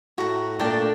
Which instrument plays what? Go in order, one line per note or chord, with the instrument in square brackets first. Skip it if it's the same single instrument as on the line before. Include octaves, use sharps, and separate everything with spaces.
[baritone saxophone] A2 [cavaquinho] F#4 A#5
[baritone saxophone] A#2 [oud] A3 [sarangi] D4 [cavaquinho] A#4 G5 A5